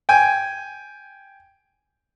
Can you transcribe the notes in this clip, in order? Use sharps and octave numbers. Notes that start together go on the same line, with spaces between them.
G5 G#5